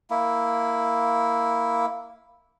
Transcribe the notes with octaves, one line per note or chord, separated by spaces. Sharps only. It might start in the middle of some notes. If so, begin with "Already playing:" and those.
A#3 E4